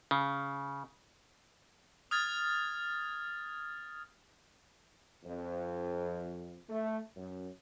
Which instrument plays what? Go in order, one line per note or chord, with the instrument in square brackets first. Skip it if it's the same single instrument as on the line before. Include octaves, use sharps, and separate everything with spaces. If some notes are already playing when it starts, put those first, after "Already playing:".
[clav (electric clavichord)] C#3
[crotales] D#6 F6 G#6 A6
[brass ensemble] F2
A3
F#2